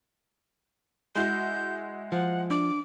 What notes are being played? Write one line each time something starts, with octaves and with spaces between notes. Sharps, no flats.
G#3 E4 F#4 G6
F3 F#5
D4 D6